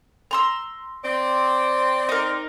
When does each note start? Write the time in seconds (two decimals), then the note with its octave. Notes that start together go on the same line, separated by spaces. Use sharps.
0.31 A#5 C6 E6
1.04 C4 D5
2.09 D#4 A#4